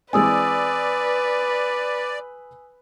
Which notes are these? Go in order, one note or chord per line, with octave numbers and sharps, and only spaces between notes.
E3 G#3 C4 B4 D5 G#5 D#6 E6